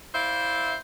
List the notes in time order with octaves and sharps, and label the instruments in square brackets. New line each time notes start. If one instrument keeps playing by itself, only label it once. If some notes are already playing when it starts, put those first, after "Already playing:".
[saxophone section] E4 C5 D5 E5 F5